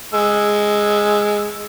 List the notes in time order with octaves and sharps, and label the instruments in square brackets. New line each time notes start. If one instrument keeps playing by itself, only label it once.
[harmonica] G#3 E6